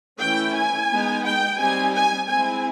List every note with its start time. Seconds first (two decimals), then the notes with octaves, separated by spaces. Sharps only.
0.20 E3 A3 C#4 E4 G5
0.55 G#5
0.90 G#3 B3 D#4
1.25 G5
1.58 G3 C4 D#4 G#5
1.94 G#5
2.27 G#3 C4 E4 G#5